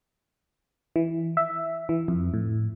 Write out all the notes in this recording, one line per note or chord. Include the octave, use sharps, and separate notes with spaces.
E3
E5
E3
F2
A2